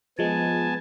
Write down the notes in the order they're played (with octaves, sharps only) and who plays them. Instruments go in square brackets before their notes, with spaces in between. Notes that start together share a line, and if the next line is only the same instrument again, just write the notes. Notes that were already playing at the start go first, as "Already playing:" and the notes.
[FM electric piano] F3 G#3 [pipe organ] B3 G#5 A5